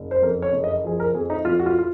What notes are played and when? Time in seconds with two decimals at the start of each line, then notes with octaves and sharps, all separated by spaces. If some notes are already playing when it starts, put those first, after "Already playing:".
Already playing: F#1
0.11 C5
0.22 F2 A#4
0.42 C#5
0.53 F#1
0.64 D#5
0.84 F3 G#4
1.00 A#4
1.15 F2 G#4
1.30 D#4
1.45 F2 F4
1.59 F#4
1.66 F4
1.79 F4